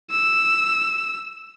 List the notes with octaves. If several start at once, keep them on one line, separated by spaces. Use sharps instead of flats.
E6